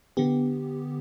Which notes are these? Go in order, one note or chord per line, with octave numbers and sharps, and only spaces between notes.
D3 B3 G4